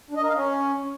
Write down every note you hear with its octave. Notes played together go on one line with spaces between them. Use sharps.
D4
D#5
A#4
F5
C#4